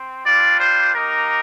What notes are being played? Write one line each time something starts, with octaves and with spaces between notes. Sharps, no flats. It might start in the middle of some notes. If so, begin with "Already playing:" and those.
Already playing: C4
G3 D4 F4 D5
C5
A#3 D#4 G4 A#4